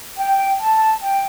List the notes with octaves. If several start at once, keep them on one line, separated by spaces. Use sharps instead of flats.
G5
A5
G5